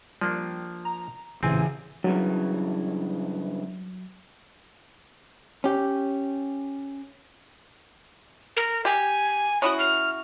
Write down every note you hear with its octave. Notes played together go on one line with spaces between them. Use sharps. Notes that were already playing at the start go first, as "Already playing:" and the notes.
F3 G3 A#3 D4
A#5
A1 A#2 C#3 E3 C4 G#5
G2 C#3 E3 F#3
C#4 G4
A#4
G4 G#5
C#4 E4 F#4 D#6
F6